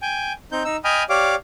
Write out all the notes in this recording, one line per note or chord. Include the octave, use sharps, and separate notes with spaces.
G5 G#5
C4 D#4 G6
D#4 E6
D#5 G5 G#5 B5 D#6 F6
G4 C#5 D5 F5 D6